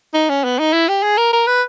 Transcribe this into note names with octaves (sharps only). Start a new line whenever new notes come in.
D#4
C#4
B3
D#4
E4
G4
G#4
A#4
A#4
B4